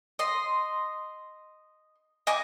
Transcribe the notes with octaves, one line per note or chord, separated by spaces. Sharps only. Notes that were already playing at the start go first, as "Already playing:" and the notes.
D#5 C6
D#5 G#5 D6